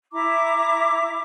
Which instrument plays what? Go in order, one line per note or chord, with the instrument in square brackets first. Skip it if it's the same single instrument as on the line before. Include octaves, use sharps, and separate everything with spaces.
[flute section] E4 E5 A#5 D6